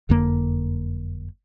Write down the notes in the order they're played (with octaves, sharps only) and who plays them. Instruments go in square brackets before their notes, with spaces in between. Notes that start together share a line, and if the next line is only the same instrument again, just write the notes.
[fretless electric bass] F#1 F2 D3 A#3